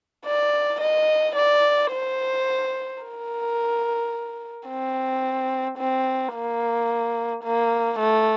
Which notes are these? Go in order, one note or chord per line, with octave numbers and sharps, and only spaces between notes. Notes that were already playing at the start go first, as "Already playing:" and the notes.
D5
D#5
D5
C5
A#4
C4
C4
A#3
A#3
A3